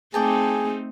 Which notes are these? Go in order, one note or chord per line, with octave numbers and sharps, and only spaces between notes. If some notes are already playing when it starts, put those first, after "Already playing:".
A3 C4 D#4 G#4 D5 G5 A5